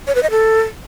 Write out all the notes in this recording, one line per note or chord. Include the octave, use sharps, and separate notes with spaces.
C#5
B4
D#5
A4